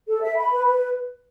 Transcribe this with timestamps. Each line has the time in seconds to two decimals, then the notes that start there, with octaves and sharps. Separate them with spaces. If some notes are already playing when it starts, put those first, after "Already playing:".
0.08 A4
0.22 E5
0.38 B5
0.52 B4
0.66 B4